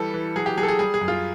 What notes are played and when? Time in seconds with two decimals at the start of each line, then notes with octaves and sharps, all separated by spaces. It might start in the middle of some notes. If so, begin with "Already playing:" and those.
Already playing: E3 G3 A4
0.14 E3
0.36 F#3 G#4
0.46 G4
0.58 F#3 G#4
0.63 A4
0.68 G#4
0.79 G3 G#4
0.94 G#4
1.01 F#2
1.08 F4